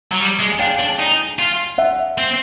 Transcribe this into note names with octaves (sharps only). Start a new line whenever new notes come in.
F#3
G3
G#3
G#5
D4 F5 G5
D4
D#4
F4
E5 F#5
C4